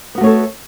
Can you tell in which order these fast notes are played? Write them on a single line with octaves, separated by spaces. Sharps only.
B3 F#4 A3 C#5 A4